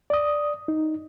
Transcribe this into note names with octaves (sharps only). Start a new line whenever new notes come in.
D5 D#6
D#4